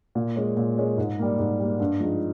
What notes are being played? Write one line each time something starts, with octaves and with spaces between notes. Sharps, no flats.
A#2
G#3 C#4
A#2
G#3 C#4
G#2
G3 A#3
G#2
G3 A#3
G2
F3 G#3 D#4 G#4